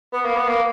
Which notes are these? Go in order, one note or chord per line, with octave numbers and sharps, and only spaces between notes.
B3
A#3
B3
A#3